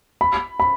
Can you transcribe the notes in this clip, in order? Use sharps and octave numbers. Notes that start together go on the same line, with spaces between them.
B5
B5